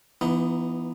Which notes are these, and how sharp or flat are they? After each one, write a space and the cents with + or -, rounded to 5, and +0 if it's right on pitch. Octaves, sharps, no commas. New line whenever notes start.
E3 +30 B3 +0 D#4 +0